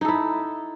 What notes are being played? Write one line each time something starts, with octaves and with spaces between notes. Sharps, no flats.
D#4 E4 A4